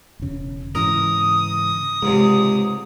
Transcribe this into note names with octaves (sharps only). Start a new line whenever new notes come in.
E1 C#3
G#2 C#3 E3 A#4 D#6
C#2 G#2 C3 G#3